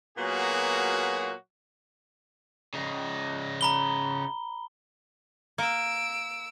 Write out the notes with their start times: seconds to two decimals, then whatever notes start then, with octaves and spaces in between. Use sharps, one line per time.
0.17 A#2 F#3 A#3 B3 F#4 G#4
2.74 C#3 D#4
3.61 A#5 B5 G7
5.58 A#3 E6 D7